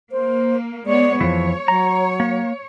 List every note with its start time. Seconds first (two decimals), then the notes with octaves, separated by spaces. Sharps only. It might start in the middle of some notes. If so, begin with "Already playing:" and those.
0.12 A#3 C5
0.86 G#3 B3 C#5 D5
1.21 F2 E3 F3 C#5
1.68 F#3 A#5
2.20 A#3